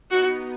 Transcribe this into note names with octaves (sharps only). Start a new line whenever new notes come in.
B3 D#4 F#4